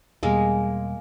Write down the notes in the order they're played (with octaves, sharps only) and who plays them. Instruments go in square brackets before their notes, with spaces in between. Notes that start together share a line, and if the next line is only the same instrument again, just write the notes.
[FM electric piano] E2 B2 G3 [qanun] G#3 A#3